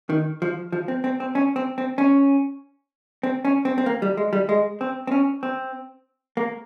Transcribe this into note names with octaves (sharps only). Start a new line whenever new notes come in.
D#3
F3
F3
C4
C4
C4
C#4
C4
C4
C#4
C4
C#4
C4
C4
A#3
G3
G#3
G3
G#3
C4
C4
C#4
C4
A#3